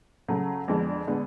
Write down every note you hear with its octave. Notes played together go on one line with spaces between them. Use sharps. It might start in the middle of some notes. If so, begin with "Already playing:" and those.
C#3 F#3 A3
F2 D3 G#3 B3 D4
D3 G#3 B3 D4